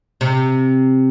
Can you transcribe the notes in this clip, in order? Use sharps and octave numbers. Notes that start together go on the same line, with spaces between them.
C3